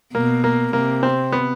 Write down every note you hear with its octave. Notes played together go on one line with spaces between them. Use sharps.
B2 A#3
A#3
C3 A#3
C4
B3